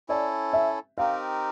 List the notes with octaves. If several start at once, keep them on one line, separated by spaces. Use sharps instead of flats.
C#4 E4 A4 D5
E5
C4 D#4 G4 A#4 F5